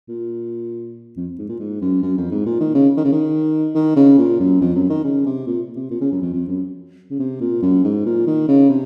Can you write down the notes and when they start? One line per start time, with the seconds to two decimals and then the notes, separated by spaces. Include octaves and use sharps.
0.09 A#2
1.17 F2
1.38 G#2
1.49 A#2
1.60 G#2
1.81 F#2
2.02 F#2
2.17 F2
2.31 G#2
2.46 A#2
2.60 D#3
2.74 C#3
2.97 D#3
3.04 C#3
3.12 D#3
3.75 D#3
3.96 C#3
4.18 A#2
4.40 F#2
4.61 F2
4.75 F#2
4.90 D#3
5.04 C#3
5.26 C3
5.47 A#2
5.76 C3
5.91 A#2
6.01 C#3
6.12 F#2
6.22 F2
6.33 F2
6.48 F#2
7.11 C#3
7.19 C3
7.41 A#2
7.62 F#2
7.84 G#2
8.06 A#2
8.27 D#3
8.48 C#3
8.70 C3